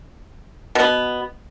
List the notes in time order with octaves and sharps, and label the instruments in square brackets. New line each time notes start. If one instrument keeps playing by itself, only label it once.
[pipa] B2 B3